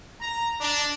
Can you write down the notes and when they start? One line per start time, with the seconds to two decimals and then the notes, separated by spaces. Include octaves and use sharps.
0.21 A#5
0.60 D4